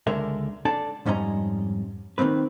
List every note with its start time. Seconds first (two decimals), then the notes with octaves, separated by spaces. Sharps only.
0.07 C#2 D3 G#3 D4 A#4 E5
0.65 D4 A4 D5 A5
1.06 F2 G#2 G3 C#4 D#5 A#5
2.18 D#3 F3 A#3 C4 B4